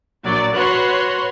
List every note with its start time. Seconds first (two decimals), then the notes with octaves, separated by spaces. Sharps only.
0.25 A#1 F#3 D5
0.55 F#4 B4 C#5 C6 F#6